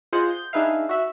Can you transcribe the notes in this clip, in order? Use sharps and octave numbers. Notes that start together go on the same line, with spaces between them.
F4 G#4 C5 D#5 F#5
G6
D4 D#4 G#4 B4 E5 F5
F#4 E5